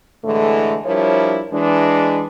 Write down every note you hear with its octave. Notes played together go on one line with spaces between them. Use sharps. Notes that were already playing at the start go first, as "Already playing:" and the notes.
A2 D3 E3 G#3 A3
F3 G3 D4 E4 A#4 C#5
E3 G#3 D4